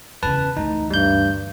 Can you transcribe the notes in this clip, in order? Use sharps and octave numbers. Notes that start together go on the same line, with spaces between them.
E2 C#3 B4 A5
D2 E3 D#4
G2 G3 G6